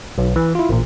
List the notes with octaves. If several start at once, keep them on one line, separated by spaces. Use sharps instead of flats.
B1
E3
E4 F4
A1 A#2